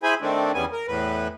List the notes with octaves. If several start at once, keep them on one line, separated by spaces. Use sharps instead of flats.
E4 G#4 C5 G#5 B5
D#3 A3 C4 D4
E2 C#3 G3 B3 G#5
A#4
E2 A2 B4